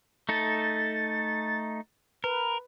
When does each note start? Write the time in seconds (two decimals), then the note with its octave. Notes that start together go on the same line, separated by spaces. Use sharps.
0.29 A3 D#4 A4 A6
2.24 A#4 B4